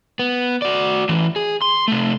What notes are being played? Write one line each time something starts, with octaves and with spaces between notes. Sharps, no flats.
B3
F#4 D5
A2 E3
G#4
C6
C3 A3